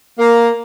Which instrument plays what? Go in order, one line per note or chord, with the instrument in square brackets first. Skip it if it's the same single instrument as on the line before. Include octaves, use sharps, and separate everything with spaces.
[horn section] A#3